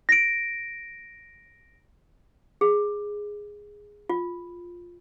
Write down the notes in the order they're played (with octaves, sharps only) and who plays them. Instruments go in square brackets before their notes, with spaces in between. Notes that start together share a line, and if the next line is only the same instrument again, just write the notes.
[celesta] A#6 D7
[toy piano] G#4
F4